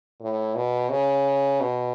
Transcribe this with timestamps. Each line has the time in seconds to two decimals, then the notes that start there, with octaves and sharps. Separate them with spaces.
0.21 A2
0.56 B2
0.90 C#3
1.61 B2